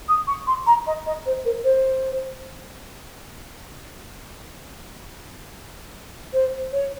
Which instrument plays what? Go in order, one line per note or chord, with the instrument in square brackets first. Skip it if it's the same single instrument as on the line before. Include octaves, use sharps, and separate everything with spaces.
[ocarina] D#6
C#6
C6
A#5
D#5
D#5
C5
A#4
C5
C5
C#5